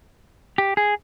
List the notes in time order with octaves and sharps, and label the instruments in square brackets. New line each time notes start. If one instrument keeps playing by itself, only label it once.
[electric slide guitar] G4
G#4